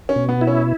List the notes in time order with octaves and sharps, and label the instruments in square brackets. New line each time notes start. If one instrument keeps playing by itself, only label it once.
[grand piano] C#4
[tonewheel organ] B2
[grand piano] B3
[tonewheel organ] E4
[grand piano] C#4